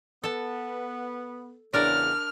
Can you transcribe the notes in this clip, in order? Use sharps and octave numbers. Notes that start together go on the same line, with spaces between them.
B3 A4 A5
E2 C#3 D4 A#4 C#5 D5 F6